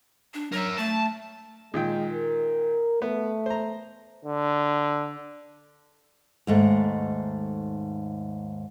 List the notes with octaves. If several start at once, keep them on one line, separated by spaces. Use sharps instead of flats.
D4
F#3 A#4 E5
A3 A5
A#2 D#3 G#3 G5
A#4
A3 B3
C5 A#5
D3
D#2 G#2 A3